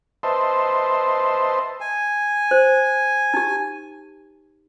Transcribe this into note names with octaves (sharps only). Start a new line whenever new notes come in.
B4 C5 D#5 E5 A5 C6
G#5
C5
D#4 G4